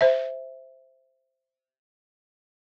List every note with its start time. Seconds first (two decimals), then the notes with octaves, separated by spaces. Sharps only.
0.01 C5 E5